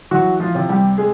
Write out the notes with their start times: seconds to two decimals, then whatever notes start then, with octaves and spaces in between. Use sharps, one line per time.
0.11 E3 F#3 F#4
0.40 F3 F4
0.55 C3
0.69 G3 G4
0.98 G#3 G#4